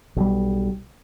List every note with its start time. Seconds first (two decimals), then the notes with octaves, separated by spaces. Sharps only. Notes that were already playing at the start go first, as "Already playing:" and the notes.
0.16 B1 G3